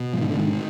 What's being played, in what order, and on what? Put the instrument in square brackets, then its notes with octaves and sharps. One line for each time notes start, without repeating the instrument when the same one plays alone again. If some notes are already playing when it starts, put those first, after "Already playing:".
Already playing: [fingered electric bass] B2
G#2 F3
D#3
D3
G#2 D#3